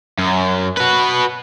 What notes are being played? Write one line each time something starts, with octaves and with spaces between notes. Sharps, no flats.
F#2
F#4 B4